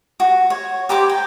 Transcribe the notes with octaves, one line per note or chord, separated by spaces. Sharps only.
F#4
C#5
G4 A#4 C5 D6
G5